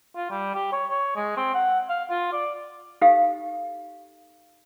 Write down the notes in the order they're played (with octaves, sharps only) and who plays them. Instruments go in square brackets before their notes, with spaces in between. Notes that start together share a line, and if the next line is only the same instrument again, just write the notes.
[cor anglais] F4
G3
G4
C#5
C#5
G#3
C4
F#5
F5
F4
D5
[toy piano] D#4 G4 A4 F5